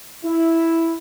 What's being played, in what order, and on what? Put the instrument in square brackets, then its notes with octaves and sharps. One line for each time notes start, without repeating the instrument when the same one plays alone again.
[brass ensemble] E4